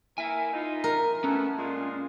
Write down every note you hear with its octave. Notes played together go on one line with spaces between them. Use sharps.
A#3 E4 A#4 E5 G#5
D#4 F4
A#4
A3 B3 C#4 E4
A#2 G#3 F4